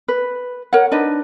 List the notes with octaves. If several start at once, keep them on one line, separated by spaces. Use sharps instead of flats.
B4
A#4 C#5 F#5
D4 D#4 B4 D#5